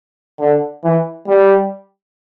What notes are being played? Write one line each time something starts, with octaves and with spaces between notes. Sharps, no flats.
D3
E3
G3